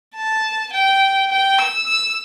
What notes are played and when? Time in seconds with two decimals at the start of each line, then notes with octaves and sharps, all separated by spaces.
0.16 A5
0.73 G5
1.31 G5
1.58 E6
1.87 E6